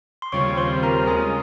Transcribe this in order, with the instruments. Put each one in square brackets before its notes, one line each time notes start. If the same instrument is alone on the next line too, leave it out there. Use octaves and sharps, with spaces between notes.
[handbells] C6
[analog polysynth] D#2 C#3 G3 C4 F4 [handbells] C#5 C#6
[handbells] C5 C6
A#4 A#5
[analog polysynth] C#3 G#3 C#4 F4 [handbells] G#4 G#5